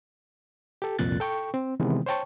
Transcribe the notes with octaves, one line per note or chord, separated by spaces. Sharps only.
G4 A4
C2 F2 A#2 F#6 A6
A4 G5 C#6
C4
C3 D#3 E3 G#3 B3
C5 C#5 G5 A5 C#6